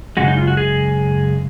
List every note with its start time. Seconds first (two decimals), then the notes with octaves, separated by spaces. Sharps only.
0.17 F#2 C#3 G#3 F#4
0.28 D#4
0.38 F4
0.47 F#4
0.57 G#4